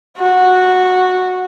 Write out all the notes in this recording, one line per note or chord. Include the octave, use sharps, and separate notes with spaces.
F#4